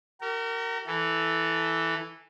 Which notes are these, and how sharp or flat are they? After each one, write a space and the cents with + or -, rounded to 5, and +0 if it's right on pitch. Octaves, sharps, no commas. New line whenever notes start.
F#4 +45 A#4 -20
E3 +0 A4 +0